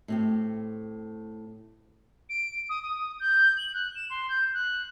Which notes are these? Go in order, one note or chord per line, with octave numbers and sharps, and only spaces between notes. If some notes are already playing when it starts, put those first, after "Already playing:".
A2 C4 G4
D7
D#6
D#6
G6
F#7
F#6
E7
C6
G6
F#6